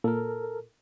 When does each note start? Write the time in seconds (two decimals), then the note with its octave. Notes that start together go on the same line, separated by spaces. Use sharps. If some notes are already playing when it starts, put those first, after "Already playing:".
0.04 A#2 A4 A#4